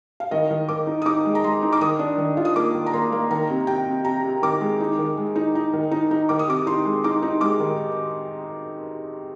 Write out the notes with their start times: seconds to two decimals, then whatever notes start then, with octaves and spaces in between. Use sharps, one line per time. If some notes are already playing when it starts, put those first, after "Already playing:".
0.20 F5
0.31 D#3 D#5
0.51 D#3
0.69 D#3 D6
0.87 D#4
1.02 D#6
1.06 D#4 D6
1.25 G#3
1.35 A#5
1.44 G#3 C6
1.63 D#4
1.73 D6
1.81 D#3 D#6
1.99 D4
2.18 D#3
2.37 F4
2.45 D#6
2.56 A#3 D6
2.75 D#3
2.86 A#5
2.93 A#3 C6
3.12 A#3
3.31 D#3 A#5
3.50 C3
3.67 C3 G5
3.86 C3
4.05 C3 A#5
4.23 C3
4.42 D#3 D6
4.61 G#3
4.80 D#4
4.99 D#3
5.17 G#3
5.36 D#4
5.55 D#4
5.73 D#3
5.91 D#4
6.11 D#4
6.29 D#3 D6
6.39 D#6
6.48 C3 D6
6.67 D#4 C6
6.85 G#3
7.04 D#4 D6
7.22 D#4
7.41 G#3 D6
7.60 D#3